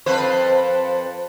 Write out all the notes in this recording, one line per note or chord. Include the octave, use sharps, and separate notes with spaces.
F2 B4 C5